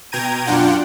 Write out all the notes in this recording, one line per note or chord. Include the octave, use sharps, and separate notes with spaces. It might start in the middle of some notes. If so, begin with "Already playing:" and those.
B2 G5 A#5 G#6 D#7
F#2 D4 F4 F#5 G5